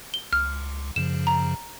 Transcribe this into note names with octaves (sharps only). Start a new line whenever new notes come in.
G7
C#2 F6
F#2 C#3 F3 E7
A#5